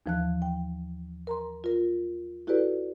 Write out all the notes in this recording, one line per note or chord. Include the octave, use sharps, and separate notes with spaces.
D#2 E3 F3 A5 F#6
G5
A#4 A#5 C6
F4 A#4
E4 F#4 G4 A4 B4 D5